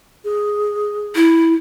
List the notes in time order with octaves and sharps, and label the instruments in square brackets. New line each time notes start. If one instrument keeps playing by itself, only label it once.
[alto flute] G#4
[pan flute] E4